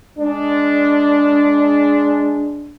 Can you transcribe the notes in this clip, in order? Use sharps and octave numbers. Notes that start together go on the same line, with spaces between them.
G#3 D4